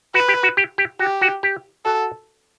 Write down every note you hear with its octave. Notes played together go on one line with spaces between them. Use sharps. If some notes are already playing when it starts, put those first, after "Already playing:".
F#4 B4
G4
F#4
G4
G4
F#4 G4
F#4
G4
F#4 A4